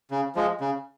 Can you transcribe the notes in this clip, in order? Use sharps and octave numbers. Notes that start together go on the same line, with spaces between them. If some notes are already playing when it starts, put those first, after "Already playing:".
C#3
F3 G#3
C#3